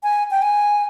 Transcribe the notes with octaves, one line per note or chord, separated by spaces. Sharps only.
G#5
G5
G#5